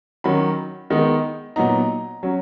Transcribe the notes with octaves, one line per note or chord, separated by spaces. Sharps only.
D#3 F#3 C#4 B5
D#3 G#3 B3 D#4
A#2 F#3 B3 D#4 A#5
F#3 C#4